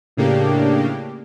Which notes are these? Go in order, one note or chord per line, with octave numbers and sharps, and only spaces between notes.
A2 C#3 A#3 D4 G4